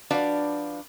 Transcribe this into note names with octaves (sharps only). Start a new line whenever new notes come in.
F3 D4 F#4 B4 D5 F5